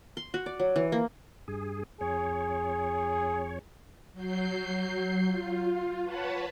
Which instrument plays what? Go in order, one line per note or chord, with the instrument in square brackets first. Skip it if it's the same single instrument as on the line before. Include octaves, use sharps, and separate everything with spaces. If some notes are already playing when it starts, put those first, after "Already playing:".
[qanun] C6
F#4
D5
F#3
E3
A#3
[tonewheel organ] G2 G#4
[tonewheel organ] F2 C#5 [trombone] G#4
[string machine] F#3 G6 C7
F4
B4 C#5 F#5 A5 B5